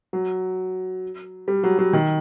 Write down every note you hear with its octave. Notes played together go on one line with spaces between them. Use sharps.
F#3
G3
F#3
F#3
D#3